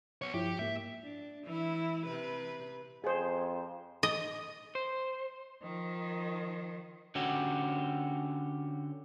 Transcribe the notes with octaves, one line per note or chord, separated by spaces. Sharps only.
B3 C#5
G2 F3 E4 G4
G#2 A#3 E5
D4
E3 E4
C3 B4
F2 G#4 C5
D#5
C5
D#3 F3
D3 C#4 F#4 G4